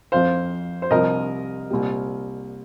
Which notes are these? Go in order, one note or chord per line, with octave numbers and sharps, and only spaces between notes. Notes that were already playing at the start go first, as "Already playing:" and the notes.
F2 F3 C4 C5 F5
C5
C2 C3 F3 A#4 D#5
C2 A#2 G3